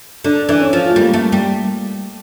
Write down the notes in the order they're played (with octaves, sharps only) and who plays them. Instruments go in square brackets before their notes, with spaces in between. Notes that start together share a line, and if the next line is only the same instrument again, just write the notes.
[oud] D3 [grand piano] D4
[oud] E3 [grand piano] D4
[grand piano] C#4
[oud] F3
[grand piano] A3
[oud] G3 [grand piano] A#3
[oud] A3
G3